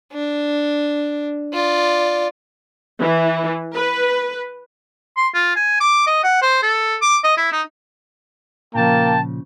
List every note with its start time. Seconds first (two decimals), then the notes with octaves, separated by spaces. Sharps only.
0.13 D4
1.53 F4 D5
3.02 E3
3.75 B4
5.17 C6
5.34 F4
5.56 G#5
5.81 D6
6.07 D#5
6.24 F#5
6.42 C5
6.63 A4
7.02 D6
7.24 D#5
7.37 E4
7.52 D#4
8.75 A#2 C#3 F3 A#3 G5 A5